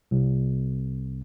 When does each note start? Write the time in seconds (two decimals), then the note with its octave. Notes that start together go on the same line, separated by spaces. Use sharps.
0.11 C2